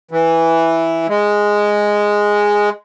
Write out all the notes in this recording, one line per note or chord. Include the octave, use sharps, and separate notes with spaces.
E3
G#3